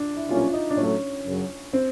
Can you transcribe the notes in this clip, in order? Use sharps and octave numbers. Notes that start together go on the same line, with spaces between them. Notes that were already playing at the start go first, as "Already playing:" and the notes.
Already playing: D4
E4
B1 A#2 G3 A#3 C#4 F4
D#4
D4
A2 F#3 A3 C#4
F#2 C#3 F#3
C4